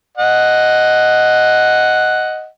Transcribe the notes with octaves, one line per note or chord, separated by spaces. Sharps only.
D#5 F#5